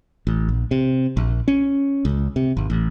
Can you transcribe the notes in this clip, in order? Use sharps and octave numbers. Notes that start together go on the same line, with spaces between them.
A1
A#1
C3
A#1
C#4
C#2
C3
G#1
A1